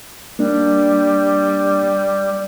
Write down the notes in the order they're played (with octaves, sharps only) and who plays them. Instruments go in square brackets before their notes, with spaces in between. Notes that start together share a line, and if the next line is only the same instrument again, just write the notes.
[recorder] G3 [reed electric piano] A#3 D4